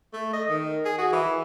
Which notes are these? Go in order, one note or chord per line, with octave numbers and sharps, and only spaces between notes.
A3
D#5
D#3
G#4
F#4
E3